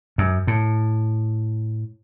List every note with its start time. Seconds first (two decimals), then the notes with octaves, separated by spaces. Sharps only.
0.18 F#2
0.47 A2